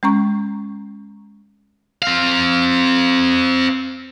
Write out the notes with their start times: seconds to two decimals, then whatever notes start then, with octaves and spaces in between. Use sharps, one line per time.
0.03 G#3 C#4 A#5 C#6
2.02 C4 F5